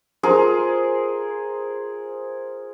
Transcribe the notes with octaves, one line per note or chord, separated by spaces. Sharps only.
F4 G#4 A#4 C5